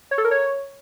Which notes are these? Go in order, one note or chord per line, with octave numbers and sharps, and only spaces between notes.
C#5
A4
A#4
C#5